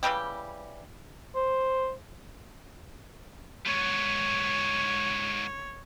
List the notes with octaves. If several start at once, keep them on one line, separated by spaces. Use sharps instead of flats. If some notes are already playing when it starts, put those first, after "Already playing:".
C#3 E3 G3 G4
C5
G#2 B3 C#5